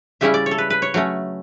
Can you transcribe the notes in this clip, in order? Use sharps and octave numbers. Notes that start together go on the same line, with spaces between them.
C#3 G3 C#4 E4 E5
D5
C#5
A4
B4
B4
C#5
F#3 A3 C#4